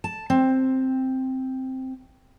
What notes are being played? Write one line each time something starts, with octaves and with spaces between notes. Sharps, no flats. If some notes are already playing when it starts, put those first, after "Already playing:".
A5
C4